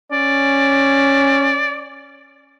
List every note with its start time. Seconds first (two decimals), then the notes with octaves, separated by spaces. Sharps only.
0.12 C#4 D5